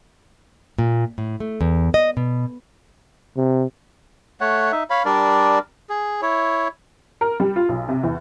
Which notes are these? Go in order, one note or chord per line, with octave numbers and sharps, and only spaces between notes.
A#2
A2
A3
E2
D#5
B2
C3
A3 C#5 F#5
D#4 E5
C#5 F5 B5
G3 D4 A#4 D5
G#4
E4 C#5
A#4
G3
F4
B1
C3
E2